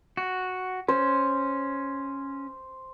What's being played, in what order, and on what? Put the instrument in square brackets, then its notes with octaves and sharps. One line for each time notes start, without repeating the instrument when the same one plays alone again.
[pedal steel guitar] F#4
[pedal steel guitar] C#4 [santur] C5